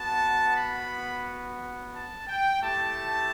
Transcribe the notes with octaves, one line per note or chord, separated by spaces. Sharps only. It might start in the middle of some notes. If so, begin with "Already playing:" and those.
Already playing: B3 F#4 A5
B5
A5
G5
A3 E4 G4 A5